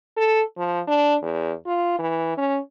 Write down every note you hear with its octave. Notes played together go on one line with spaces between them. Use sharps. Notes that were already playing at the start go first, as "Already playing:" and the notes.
A4
F3
D4
E2
F4
E3
C#4